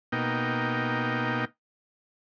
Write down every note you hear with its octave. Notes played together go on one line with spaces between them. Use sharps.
B2 A#3 D#4 G5